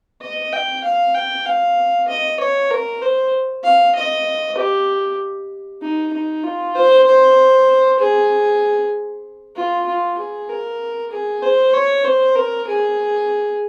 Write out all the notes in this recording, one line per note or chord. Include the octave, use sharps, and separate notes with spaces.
D#5
G5
F5
G5
F5
D#5
C#5
A#4
C5
F5
D#5
G4
D#4
D#4
F4
C5
C5
G#4
F4
F4
G#4
A#4
G#4
C5
C#5
C5
A#4
G#4